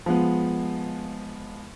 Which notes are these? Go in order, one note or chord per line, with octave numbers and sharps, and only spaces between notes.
F3 G#3 B3